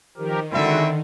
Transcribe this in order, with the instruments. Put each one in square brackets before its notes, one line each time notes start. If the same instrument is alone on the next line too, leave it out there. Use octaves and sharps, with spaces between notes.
[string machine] D#3 [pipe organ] F3 G4 A#4
[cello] D3 [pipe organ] G#3 F#4 [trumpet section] C4 E4 E5